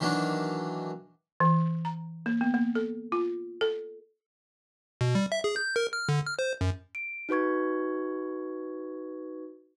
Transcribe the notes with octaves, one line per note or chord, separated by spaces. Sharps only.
D#3 E3 F#3 A#3 D4
E3
A#5
A#3
B3
A#3
A4
F4
A4
B2
G3
E5
G#4
G6
A#4
F6
D3
F6
C5
F#2
D7
D#4 F#4 B4 C#6 G#6